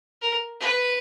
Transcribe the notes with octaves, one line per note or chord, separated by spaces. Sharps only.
A#4
B4